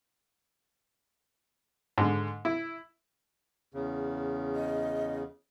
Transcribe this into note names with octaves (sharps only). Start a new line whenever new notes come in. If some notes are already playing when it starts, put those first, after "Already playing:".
G#2 D3
E4
E2 C#3
D#5